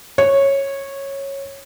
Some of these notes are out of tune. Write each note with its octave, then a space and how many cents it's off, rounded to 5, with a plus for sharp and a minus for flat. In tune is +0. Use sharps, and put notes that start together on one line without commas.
C#5 -10